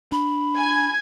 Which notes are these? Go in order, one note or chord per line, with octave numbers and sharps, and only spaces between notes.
D4 B5
G#5 G#6